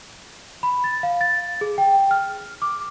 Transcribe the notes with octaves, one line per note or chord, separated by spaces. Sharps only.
B5
A6
F5
A6
G#4
G5
F6
D6